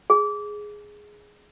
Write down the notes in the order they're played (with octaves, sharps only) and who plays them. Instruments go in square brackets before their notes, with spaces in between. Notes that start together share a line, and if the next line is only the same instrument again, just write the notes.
[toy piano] G#4